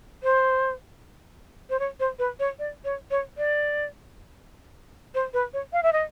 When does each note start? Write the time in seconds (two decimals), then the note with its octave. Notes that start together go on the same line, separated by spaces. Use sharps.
0.23 C5
1.70 C5
1.79 C#5
2.00 C5
2.19 B4
2.39 C#5
2.59 D5
2.85 C#5
3.11 C#5
3.38 D5
5.14 C5
5.34 B4
5.53 C#5
5.73 F5
5.83 E5
5.93 D#5